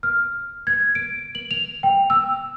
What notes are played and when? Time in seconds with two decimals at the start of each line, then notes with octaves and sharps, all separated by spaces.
0.03 F6
0.67 G#6
0.95 D7
1.35 F#7
1.51 F7
1.83 G5
2.10 E6